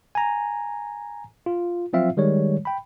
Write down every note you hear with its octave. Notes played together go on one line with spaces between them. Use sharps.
G#5 A#5
F4
F3 F#3 C4 F4 E5 F5
D#3 G3 G#3 C#5
G5 B5